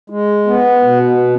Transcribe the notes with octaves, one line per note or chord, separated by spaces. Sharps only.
G#3
B3
B2